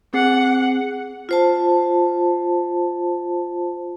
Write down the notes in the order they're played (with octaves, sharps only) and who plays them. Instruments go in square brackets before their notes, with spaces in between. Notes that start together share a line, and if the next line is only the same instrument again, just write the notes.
[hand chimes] C4 G#4 C7 [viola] F#5
[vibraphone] F4 C5 A5